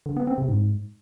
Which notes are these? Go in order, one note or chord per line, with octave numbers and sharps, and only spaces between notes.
D3
B3
C4
C3
G#2